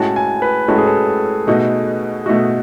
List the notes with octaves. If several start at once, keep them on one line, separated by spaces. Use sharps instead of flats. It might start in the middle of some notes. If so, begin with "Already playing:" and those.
Already playing: A2 G#3 C#4 F#4 A5
G#5
B4
A2 G#3 C#4 F#4 A4
G#4
A4
B2 A3 D#4 F#4
B2 A3 D#4 F#4